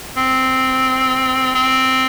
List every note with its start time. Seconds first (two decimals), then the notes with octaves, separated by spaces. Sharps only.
0.17 C4
1.55 C4